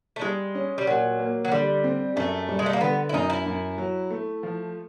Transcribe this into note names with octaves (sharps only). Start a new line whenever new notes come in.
A3
G3 G#3
C#4
G3
A#2 F#3
A#3
F#3
D3 G3
C4
F#2 A3
G3
G#3
A3
A#3
D3 B3
E4
F#2 D#4
E4
F#2
F#3
A3
F3